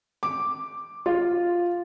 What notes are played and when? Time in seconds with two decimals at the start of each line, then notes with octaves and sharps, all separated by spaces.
0.23 D6
1.06 F4